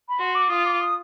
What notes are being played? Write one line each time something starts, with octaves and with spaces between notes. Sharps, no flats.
B5
F#4 C6
D6
F4 D#6
D6
D#6